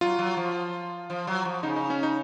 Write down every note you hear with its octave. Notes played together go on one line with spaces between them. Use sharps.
F#3 F4
F#3
F3
F3
F#3
F3
C#3 D#4
D#4
C#4
D#4